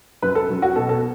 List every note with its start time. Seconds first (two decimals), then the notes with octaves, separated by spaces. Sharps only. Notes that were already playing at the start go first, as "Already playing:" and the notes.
0.22 F#2 B4
0.35 A4
0.50 F#3 C#4
0.62 F#4
0.76 B2 A4
0.89 A4